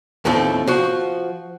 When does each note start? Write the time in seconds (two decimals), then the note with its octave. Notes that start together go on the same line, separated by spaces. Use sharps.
0.25 D#2 A2 F3 A3 C4
0.67 F3 F#4